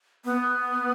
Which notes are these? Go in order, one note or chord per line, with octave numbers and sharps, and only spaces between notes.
B3